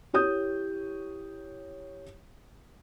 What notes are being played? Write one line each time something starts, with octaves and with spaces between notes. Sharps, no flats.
E4 G4 C#5 D#6 G6